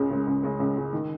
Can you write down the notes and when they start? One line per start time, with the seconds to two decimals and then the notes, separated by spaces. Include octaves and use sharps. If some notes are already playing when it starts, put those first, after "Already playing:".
Already playing: C#2 C#3 G#3
0.11 C#3 G#3
0.27 C#2
0.43 C#3 G#3
0.60 C#2
0.76 C#3 G#3
0.93 D#3